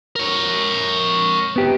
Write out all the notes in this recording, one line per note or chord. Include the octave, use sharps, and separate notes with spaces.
A#4 C#5
B3 G4